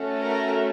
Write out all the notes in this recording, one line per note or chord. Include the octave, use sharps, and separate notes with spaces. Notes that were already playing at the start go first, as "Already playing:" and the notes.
Already playing: A3 C#4 F#4 A4
A#4